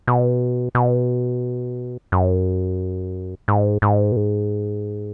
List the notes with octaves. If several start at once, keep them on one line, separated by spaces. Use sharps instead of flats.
B2
B2
F#2
G#2
G#2
B2
G#2